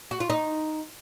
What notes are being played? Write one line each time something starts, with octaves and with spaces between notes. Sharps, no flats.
F#4
F4
D#4